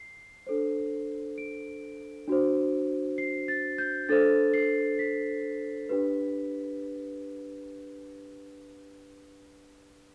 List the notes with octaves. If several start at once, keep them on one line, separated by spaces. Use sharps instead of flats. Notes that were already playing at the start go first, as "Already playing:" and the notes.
Already playing: C7
D4 A4 C5
D7
D4 F#4 C5
C7
A6
G6
D4 A4 C5 A6
C7
B6
D4 G4 B4